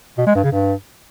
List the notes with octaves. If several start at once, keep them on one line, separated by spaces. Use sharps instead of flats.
B2
G#3
G2
C#3
G2